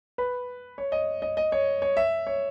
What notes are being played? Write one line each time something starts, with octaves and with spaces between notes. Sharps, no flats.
B4
C#5
D#5
D#5
D#5
C#5
C#5
E5
C#5